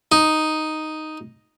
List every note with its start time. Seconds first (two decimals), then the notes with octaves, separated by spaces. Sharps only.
0.12 D#4